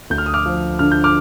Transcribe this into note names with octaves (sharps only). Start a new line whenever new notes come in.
D2 G6
F6
D#6
D6 F6
F3
D3 F6
G6
D6 F6